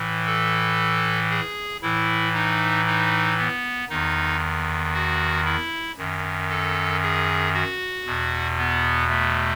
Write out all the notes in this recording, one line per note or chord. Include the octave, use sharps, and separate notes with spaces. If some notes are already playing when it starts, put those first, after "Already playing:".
Already playing: A2 E3
A4
G#4
A2 E3 E4
D#4
D#4
B3
E2 D#3 D#4
F#4
E4
F#2 D#3
A4
G#4
F#4
E2 B2
B3
A3